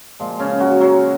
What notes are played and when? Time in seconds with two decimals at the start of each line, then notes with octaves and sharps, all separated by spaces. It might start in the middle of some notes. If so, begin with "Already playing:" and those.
0.20 A#2 F3 G#3
0.39 C#3 C#4
0.60 F#3 F#4
0.80 F#3 F#4